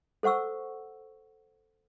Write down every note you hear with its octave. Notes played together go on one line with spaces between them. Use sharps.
A4 C5 F#5 C#6 E6